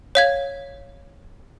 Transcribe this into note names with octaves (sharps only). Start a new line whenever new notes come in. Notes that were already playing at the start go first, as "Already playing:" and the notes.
C#5 F5 G#6